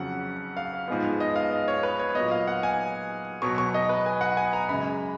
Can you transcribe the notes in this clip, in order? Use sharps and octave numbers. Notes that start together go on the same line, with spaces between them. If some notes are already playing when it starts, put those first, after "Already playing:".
Already playing: F2 C#3 F#3 F#5
F5
G#2 F3 G#3 B3
D#5
F5
D#5
C#5
B4
C#5
A#2 F#3 B3 D#5
F5
F#5
G#5
B2 F#3 B3 C#6
C#6
D#5
B4
G#5
F#5
G#5
A#5
F#2 C#3 G#3 B5